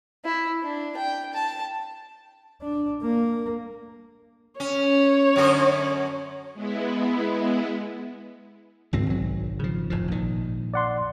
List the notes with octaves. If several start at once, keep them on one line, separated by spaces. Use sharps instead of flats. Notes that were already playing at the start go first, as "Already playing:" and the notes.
E4
D4
G5
A5
D4
A#3
C#4 C#5
F#2 D3 A#4
G#3 B3 E4
G#1 C#2 C4
B1 F#3
C#3 F3
F1 A2 F3
A#1 D#3
D5 F#5 C6